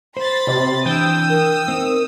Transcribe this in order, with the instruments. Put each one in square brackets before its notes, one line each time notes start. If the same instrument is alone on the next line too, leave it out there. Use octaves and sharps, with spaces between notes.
[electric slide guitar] C5 [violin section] B5 C6 A6
[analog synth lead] C3
[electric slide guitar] E3 D4 [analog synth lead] G5 [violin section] D#6 E6
[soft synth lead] A#4
[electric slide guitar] C4 D#4